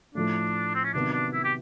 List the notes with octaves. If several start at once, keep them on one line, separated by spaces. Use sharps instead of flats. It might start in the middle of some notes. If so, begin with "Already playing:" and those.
A2 F3 A3 D4
C4
C#4
C3 D#3 F#3 B3 D4
D4
E4
G4